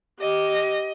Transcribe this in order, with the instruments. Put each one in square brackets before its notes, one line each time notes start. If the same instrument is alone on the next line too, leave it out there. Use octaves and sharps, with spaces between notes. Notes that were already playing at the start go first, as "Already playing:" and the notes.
[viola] G4 [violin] D#5